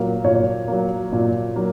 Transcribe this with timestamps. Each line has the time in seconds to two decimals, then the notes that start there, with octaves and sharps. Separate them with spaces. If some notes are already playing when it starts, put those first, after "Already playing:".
Already playing: A#2 F#3 A#3
0.24 A#2 C#5
0.68 F#3 A#3
1.12 A#2
1.56 F#3 A#3